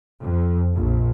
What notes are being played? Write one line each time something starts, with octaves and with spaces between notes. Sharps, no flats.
F2
A#1